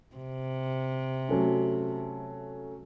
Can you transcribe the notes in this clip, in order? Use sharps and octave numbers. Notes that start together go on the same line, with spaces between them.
C3
F#3 A3 C#4